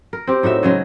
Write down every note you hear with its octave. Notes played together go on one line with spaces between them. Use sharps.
A#4
C4 G4
A2 D#4 F#4 E5
C#3 F#3 G#3